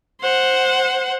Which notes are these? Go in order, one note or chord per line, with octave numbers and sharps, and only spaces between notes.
C5 F#5